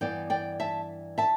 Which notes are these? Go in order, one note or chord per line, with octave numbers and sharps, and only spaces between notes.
G2 E3 B3 D5 G5
D5 G5
E5 A5
E5 A5